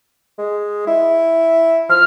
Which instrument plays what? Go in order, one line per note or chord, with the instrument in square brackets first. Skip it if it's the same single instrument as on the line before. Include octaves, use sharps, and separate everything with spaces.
[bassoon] G#3
E4
[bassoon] F3 [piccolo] F6